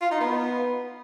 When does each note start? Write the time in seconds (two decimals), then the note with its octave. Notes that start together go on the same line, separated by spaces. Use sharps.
0.01 F4
0.11 D#4
0.21 B3